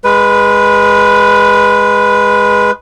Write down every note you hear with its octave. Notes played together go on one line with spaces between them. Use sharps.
G#3 B4